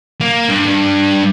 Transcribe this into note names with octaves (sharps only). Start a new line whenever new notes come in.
A#3
G2
G2